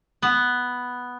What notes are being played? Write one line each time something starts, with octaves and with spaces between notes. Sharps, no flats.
B3